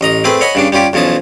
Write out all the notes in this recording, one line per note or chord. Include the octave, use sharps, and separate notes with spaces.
A1 D#5 A#5 D#6
A3 C4 G#4 B4
C#5 D#5 F#5 G#5 B5
G2 C#3 D4
G3 C#4 F4 G4
B1 E2 F3 C#4 A5 D#6